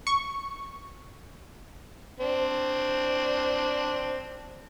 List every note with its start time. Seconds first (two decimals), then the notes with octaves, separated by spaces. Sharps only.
0.07 C#6
2.20 C4 D4